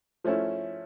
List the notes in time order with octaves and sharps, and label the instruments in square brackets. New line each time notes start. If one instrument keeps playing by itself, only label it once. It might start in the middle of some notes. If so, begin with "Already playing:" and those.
[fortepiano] F3 A3 C#4 E4